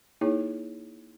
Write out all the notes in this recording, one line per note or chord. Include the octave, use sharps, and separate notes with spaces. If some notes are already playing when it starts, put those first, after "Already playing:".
A#3 D#4 E4 G#4 C#5